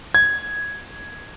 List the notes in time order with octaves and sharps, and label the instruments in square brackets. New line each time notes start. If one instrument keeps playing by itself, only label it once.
[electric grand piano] G#6